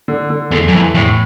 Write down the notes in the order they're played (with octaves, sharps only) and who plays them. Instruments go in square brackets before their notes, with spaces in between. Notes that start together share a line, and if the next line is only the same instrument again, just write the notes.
[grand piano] D3
D3
[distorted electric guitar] E2 [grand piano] A3
[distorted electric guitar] F#2
[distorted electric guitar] F2 [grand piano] E3
[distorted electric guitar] E2 [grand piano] A2